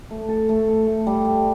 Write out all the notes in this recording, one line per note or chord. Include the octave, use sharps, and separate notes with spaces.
A3
A4
A3
A4
A3
G3
G3